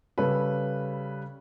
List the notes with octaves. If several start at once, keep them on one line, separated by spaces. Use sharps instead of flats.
C#3 G3 C#4 A4 B4